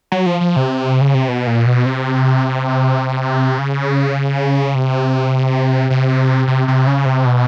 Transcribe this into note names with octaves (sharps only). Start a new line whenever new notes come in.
F#3
F3
F3
C3
C#3
C3
B2
A#2
B2
C3
C#3
C3
C3
C3
C3
C#3
C3
B2